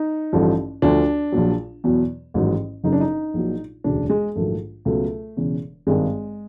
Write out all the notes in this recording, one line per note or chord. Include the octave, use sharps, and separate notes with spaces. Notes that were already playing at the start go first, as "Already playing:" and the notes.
Already playing: D#4
A1 G2 D3 F3
D2 D3 F3 D4
A#1 A#2 F#3
E2 B2 F#3
A1 G#2 D#3 F#3
F#1 F#2 C#3 D#4
D4
D#4
A#1 A#2 F#3
E1 D2 C#3 D4
G#3
A#1 G#2 D#3 F#3 A3
C#2 B2 F#3 A3
E1 E2 C#3
G#1 G2 D#3 G#3